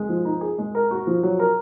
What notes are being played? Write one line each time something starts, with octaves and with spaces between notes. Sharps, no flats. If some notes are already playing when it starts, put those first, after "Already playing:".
Already playing: G#3
F3
D#4
G#4
G#3
A#4
F#4
F3
F#3
A#4